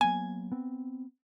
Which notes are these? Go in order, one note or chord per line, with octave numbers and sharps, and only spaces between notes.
F#3 A#3 B3 G#5
B3 C4